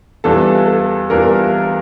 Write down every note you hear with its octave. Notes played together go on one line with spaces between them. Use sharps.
E2 E3 G3 D4 F4 A4
A4
E2 E3 G3 D4 F4 A#4